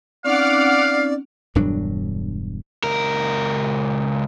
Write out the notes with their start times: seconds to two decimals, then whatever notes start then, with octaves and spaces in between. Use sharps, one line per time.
0.24 C4 C#4 D#4 D5 F5 F#5 D6 F6
1.55 E1 G2 F#3 D4
2.84 C#2 A#4